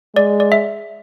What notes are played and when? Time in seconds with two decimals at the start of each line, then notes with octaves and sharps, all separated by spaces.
0.16 G#3 D5
0.40 D5
0.52 E5